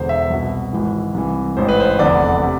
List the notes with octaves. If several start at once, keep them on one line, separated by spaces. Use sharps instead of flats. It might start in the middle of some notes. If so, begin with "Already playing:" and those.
Already playing: E1 E2 D3 C5
E5
C2 B2
G#1 G#2 E3
C2 C3 E3
A1 G#2 E3 C5
B4
C5
F1 E2 D3 D5
C3